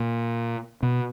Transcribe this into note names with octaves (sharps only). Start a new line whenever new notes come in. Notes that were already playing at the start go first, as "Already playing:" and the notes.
Already playing: A#2
B2